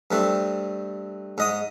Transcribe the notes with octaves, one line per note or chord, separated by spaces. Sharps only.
G2 A3 C4
G#2 D#5 D#6